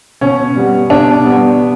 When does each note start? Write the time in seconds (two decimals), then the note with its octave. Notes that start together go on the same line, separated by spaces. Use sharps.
0.21 B2 C#4
0.56 G3 B3
0.90 B2 D4
1.25 G3 B3